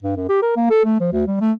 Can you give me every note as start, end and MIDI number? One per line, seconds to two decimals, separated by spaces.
0.03 0.16 43
0.16 0.25 42
0.29 0.42 67
0.42 0.53 70
0.56 0.65 58
0.70 0.84 69
0.85 0.99 57
1.00 1.12 53
1.12 1.27 38
1.27 1.37 55
1.41 1.51 57